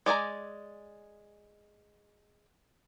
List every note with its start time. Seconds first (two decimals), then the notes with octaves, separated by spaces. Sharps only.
0.06 G#3 D5 G#5 A#5